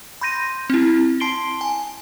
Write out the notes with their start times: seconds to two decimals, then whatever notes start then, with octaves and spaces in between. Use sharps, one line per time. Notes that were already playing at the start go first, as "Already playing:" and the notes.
0.21 B5 C6 G6 A#6 D#7
0.70 C4 E4
1.20 A5 C6 C7 D7 G7
1.61 G#5